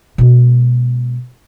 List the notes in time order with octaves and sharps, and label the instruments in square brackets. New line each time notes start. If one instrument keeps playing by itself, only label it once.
[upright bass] B2 G#3